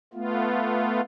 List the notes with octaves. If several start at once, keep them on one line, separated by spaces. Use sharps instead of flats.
A3 B3 F4